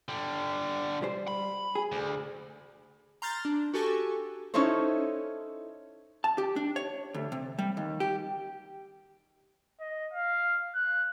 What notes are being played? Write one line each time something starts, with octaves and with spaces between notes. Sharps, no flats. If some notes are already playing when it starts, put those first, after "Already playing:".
D3 G3
G3 C5
B5
G#4
D2
A#5 C6 F6 G6 A6
D4
F#4 G4 A4 G#5 C#6
C#4 D#4 E4 A4 C5 C#5
A5
G4
D4
C#5
D2
C3
G3
D#2
G4
D#5
F5
F#6